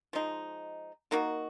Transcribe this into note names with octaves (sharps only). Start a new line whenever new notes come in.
F3 G#3 D#4
D#3 A#3 D#4 F#4